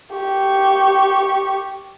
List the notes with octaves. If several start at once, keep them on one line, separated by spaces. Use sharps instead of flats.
G4 C#6